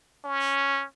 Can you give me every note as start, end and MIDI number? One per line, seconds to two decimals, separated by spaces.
0.25 0.85 61